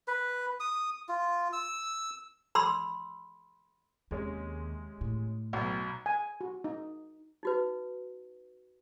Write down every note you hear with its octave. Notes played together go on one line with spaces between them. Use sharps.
B4
D#6
F4
E6
B5 C6 E6
D#2 C3 G#3 C#4
A2
B1 B2
G#5
F#4
D#4
D#4 F#4 B4